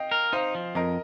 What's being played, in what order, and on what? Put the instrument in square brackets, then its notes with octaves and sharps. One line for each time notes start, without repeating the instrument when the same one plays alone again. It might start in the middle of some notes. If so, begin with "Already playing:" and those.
Already playing: [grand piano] D#5 F5 G5
[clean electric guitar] A#4
[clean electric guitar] D#4 [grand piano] C5 F5
[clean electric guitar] F3
[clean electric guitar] F2 [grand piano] A#4 D#5